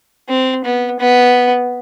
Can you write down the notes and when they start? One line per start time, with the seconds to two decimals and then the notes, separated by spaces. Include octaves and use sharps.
0.29 C4
0.65 B3
1.00 B3